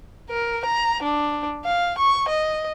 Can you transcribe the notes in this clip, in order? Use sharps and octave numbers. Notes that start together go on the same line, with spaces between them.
A#4
A#5
D4
F5
C#6
D#5